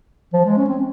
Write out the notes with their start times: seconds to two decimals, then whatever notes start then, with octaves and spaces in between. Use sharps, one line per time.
0.33 F3
0.45 G#3
0.57 C#4
0.69 C4